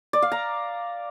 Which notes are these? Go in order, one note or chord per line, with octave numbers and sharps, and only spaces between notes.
D5
F5
A#5